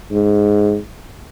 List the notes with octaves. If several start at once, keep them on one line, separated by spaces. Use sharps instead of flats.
G#2